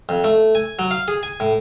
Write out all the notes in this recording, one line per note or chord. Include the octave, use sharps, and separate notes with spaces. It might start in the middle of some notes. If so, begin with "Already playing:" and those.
F2
A3
G#5
F#3
F5
G#4
G#5
A2